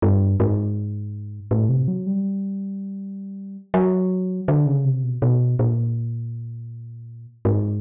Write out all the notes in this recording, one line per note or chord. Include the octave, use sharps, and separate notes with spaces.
G2
G#2
A2
C3
F#3
G3
F#3
D3
C#3
C3
B2
B2
A#2
G#2